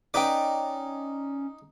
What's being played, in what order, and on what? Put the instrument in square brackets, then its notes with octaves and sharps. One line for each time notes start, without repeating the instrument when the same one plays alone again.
[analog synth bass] C#4 [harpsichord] D#4 D6 [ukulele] B4 G5 [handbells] D5 D#5 A#5